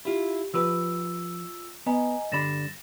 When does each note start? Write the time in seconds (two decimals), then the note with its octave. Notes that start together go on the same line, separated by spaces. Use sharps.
0.05 E4 F4 G4
0.54 F3 F4 G4 B4 E6
1.86 B3 D#5 G#5 A#5
2.32 G2 D3 B5 A6 A#6 E7